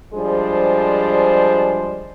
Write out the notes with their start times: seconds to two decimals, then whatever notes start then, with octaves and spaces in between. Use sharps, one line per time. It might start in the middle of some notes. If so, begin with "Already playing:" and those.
0.14 F3 G3 G#3 D4 G#4 C5